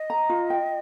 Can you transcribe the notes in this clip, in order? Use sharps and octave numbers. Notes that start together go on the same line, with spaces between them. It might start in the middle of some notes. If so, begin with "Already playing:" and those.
Already playing: D#5
A#5
F4
G5